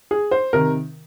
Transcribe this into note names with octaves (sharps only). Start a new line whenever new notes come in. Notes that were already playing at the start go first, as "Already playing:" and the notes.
G#4
C5
C3 D#3 A#4